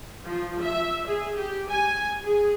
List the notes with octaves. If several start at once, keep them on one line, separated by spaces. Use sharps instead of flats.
F3
E5
G#4
G4
G#5
G#4